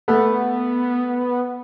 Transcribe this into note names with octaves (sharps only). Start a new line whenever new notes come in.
A3 B3